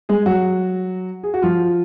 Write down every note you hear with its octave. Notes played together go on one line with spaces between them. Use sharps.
G#3 G#4
F#3 F#4
G#4
F#4
F3 F4